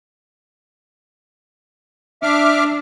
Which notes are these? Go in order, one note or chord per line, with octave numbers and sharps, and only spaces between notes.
D4 E5 D6 F6